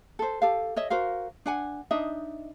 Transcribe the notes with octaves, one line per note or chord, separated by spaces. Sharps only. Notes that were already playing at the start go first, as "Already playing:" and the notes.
A4 C5
G4 A4 F5
C#5 D#5 E5
F#4 A#4 C5 F5
D4 F#5 G#5
D4 D#4 D#5 E5